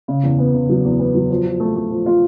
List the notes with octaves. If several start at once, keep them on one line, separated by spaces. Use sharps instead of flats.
C#3
E2
B3
C#3
F#3
E2
B3
F#3
F3
F3
A3
A3
F3
F4